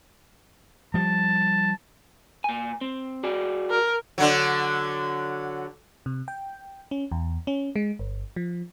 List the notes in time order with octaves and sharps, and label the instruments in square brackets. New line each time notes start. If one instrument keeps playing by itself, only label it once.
[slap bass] F3 G3 [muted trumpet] A5
[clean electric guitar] A#2 G#5
C4
F#4 G#4 D5
[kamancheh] A#4
[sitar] D3 F#3
[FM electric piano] C3
G5
C#4
E2
C#4
G#3
G1
F3